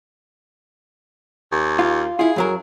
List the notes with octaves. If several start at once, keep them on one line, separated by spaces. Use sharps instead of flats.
D#2
F4
E4 F4 G#4
F#2 F#3 A#4